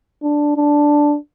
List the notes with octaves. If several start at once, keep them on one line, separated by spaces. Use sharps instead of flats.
D4
D4